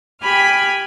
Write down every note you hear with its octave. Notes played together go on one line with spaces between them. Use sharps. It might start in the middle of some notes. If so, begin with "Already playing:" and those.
G4 G#5 B5 F6